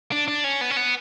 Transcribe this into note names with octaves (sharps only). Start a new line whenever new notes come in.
D4
D4
C#4
B3
C#4
B3